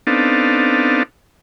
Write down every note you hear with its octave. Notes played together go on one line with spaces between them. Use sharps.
B3 C4 D4 D#4 A4 F5